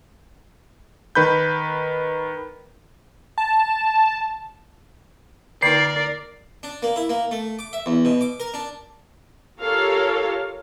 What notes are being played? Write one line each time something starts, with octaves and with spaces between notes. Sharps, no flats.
D#3 B4 B5 G6
A5
D3 A#3 D#4 A#4 D5 C7
D4
A#3
E4
A#3
A3
D6
E5
E2
B2
D6
A#4
D4
F4 G4 A4 A#4 C#5 F5